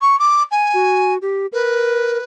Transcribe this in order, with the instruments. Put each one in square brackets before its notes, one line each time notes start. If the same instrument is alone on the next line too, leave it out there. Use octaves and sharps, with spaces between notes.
[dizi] C#6
D6
G#5
[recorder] F#4
G4
[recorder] A#4 [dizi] B4